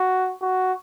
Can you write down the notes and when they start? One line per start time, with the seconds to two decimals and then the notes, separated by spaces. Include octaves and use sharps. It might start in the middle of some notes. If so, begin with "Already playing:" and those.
Already playing: F#4
0.42 F#4